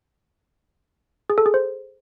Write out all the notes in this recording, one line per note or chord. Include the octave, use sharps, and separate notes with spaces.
G#4
A4
G#4
C5